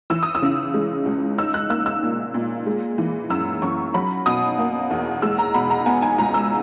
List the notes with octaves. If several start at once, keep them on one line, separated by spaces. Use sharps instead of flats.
E3 E6
D#6
E6
C#3
G#3
C#2
D#4 E6
F#6
A#3 E6
E6
A#2
A#2
G#3
E3
F#2 E6
F#2 C#6
F#3 B5
B2 D#6
A#3
E2
G#3 E6
A#5
B2 B5
A#5
B3 G#5
G#5
C#2 A#5
E6